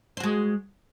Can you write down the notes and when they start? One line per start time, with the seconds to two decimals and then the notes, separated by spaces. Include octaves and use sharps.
0.17 C5
0.20 F#4
0.23 G#3